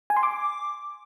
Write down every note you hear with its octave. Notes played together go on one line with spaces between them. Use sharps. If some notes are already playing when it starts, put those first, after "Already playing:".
G#5
C6
D6